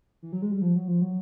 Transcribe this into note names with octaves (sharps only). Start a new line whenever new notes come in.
E3
F#3
G#3
G3
F3
F#3
F3
F#3